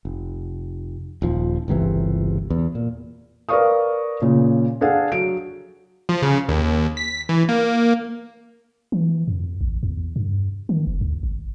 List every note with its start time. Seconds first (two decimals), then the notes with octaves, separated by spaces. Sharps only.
0.05 F1
1.22 D#1 F3
1.68 G1 C#2 C3 E3
2.50 E2
2.75 A#2
3.49 A#4 B4 D5 F5 C#6 D#6
4.22 A#2 C#3
4.81 D4 G#4 A4 F5 F#5
5.12 F#3 D7
6.09 F3
6.22 C#3
6.49 D#2
6.97 B6
7.29 E3
7.49 A#3
8.92 E3
9.28 F2
9.61 A1
9.83 E2
10.16 G2
10.69 D#3
10.87 F1
11.01 D2
11.23 G#1